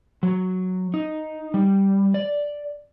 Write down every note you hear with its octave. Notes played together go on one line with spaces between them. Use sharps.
F#3
D#4
G3
D5